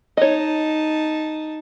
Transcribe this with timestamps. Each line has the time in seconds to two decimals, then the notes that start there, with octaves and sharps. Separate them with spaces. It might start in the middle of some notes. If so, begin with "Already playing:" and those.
0.17 D#4 C#5 D#5 A5